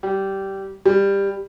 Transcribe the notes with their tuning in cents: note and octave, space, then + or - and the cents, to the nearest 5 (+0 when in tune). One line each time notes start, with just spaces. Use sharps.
G3 -15
G3 +15